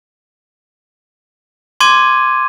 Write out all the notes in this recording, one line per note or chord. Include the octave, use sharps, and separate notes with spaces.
C6 D6 G#6 D#7